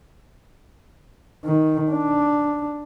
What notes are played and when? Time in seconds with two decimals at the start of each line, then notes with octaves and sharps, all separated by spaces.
1.45 D#3
1.91 D4